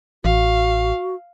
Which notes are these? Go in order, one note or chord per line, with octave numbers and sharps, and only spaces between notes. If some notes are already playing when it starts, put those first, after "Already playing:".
A1 F#4 F5